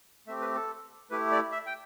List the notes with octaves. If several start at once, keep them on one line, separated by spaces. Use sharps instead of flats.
A3 C4 G4 E5
B4
A4
A3 E4 G4 B4
D5
E5
G5